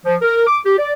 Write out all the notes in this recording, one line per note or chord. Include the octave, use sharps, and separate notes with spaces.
F3
A#4
D6
G4
D5